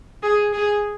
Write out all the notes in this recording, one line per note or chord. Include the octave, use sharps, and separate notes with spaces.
G#4
G#4